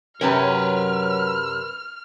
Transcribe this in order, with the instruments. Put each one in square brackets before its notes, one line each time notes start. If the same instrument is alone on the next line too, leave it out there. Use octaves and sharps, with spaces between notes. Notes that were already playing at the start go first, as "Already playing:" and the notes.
[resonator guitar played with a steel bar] F#2 C3 C#4 [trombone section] F#3 [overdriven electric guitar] A#4 B4 [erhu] F6